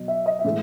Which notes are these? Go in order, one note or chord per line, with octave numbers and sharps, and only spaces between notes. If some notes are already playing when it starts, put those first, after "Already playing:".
Already playing: B2 F#3
E5
D#5
E5
A2 E3 G#3